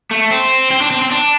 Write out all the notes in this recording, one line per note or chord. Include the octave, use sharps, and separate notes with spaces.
A3
C4
C4
D4
C4
C4
D4